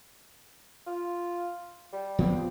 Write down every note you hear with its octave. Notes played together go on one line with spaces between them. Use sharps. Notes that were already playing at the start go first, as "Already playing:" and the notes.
F4
G3
F3 B3 C4